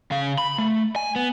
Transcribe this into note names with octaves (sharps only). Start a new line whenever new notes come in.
C#3 F5
B5
A3
G#5
B3